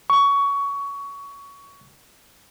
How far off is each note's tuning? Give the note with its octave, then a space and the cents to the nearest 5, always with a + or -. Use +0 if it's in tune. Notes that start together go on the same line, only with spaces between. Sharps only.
C#6 +20